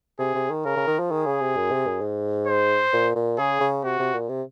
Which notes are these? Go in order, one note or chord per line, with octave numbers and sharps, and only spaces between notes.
C3 G#4
C3
D#3
C#3 A#4
C#3
D#3
F3
D#3 G#4
C#3
C3
F#2
C3
F#2
G#2
C5
A#2
A#2
C#3 G#4
C#3
C3 F#4
C3
A#2
C3